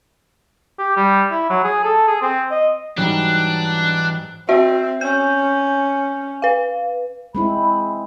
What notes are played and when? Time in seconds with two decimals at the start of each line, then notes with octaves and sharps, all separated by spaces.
0.79 G4
0.97 G3
1.31 E4
1.50 F#3
1.64 G#4
1.84 A4
2.08 G#4
2.22 C4
2.51 D#5
2.97 G#2 E3 F#3 G3 D4 F#6
4.49 C4 F#4 C5 E5
5.01 C#4 G6
6.42 B4 F5
7.35 G#3 C4 E4 B5